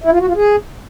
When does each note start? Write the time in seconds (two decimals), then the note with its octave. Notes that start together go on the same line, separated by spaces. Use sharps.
0.04 E4
0.12 F4
0.20 F#4
0.28 F4
0.36 G#4